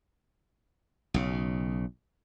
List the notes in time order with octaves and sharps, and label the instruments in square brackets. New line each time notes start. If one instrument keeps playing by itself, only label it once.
[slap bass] B1 C#3